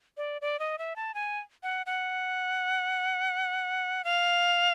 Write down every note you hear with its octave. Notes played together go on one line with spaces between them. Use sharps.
D5
D5
D#5
E5
A5
G#5
F#5
F#5
F5